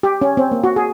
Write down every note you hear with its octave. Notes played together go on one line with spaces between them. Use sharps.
G4
C#4
C4
A#3
F#4
G#4